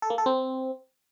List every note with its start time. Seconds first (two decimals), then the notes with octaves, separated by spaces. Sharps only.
0.02 A4
0.10 A#3
0.18 A4
0.26 C4